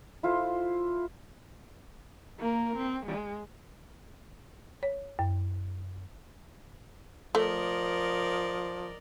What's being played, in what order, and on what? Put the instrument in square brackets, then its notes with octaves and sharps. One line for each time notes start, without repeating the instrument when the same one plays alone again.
[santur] E4 F4 A4 C5
[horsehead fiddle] A#3 A#4
C4
G#3
[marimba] C#5
F#2
[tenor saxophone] F3 [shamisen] A3 [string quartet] A#4 D5 D#5